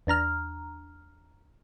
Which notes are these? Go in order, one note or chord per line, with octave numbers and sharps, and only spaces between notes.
E2 D4 A#5 F6